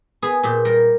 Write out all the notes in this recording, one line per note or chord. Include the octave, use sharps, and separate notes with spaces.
B3 G#4
A#2 G4
G3 A#4